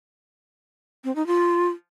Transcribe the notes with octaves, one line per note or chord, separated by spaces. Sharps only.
C4
D#4
F4